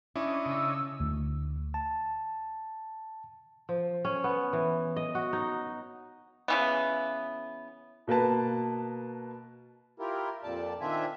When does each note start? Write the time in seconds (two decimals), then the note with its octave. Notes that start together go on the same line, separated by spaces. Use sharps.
0.16 C#4 D4 E4 C#5 D#5
0.46 C#3 E6
1.00 D2
1.74 A5
3.69 F3
4.05 C#4
4.24 B3
4.53 E3
4.96 D#5
5.15 F#4
5.33 D#4
6.48 C#3 E3 B3
8.07 B2 A#3 B4 A5
9.99 E4 F4 G4 A#4
10.43 F2 A#2 D5 A5
10.81 D#3 C4 D4 F4 E5 G#5